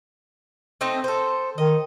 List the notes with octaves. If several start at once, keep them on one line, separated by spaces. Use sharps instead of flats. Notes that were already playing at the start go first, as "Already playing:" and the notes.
A3 C4 D#4
A4 C5
D#3 D#5